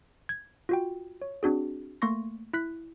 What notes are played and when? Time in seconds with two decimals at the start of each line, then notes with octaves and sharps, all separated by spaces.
0.29 G#6
0.69 F4 F#4 G5
1.22 C#5
1.43 C4 D4 F#4 G#4
2.02 A3 A#3 C6 C#6 A#6
2.53 E4 F#6 B6